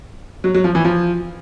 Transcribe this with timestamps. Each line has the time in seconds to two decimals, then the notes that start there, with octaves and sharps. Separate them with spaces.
0.44 F#3
0.54 F#3
0.64 F3
0.75 E3
0.85 F3